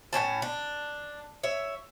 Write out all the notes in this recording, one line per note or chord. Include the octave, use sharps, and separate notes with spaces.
A2 C4 C#4 A5
D4
C#5 E5